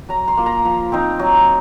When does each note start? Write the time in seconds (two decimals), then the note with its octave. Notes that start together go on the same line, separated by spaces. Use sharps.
0.09 F#3 A#5
0.28 C6
0.37 A#3 F4
0.46 A#5
0.65 F3
0.92 C4 D#4
1.19 F#3